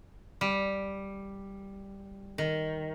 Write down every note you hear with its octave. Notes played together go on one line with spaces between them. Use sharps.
G3
D#3